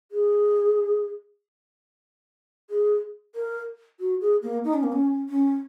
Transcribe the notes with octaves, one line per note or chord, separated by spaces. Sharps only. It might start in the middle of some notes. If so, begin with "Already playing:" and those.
G#4
G#4
A#4
F#4
G#4
A#3
D#4
C#4
A#3
C#4
C#4